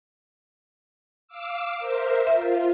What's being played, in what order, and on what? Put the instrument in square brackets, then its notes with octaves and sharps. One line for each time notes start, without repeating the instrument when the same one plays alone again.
[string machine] F5 D6 E6
A#4 C5 E5
[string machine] F4 [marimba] E5